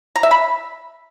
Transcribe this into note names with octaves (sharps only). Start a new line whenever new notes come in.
A#5
E5
B5